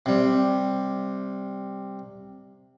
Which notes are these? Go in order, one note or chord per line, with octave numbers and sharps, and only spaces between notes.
C3 G3